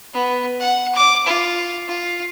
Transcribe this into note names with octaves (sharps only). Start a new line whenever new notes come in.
B3
F#5
D6
F4
F4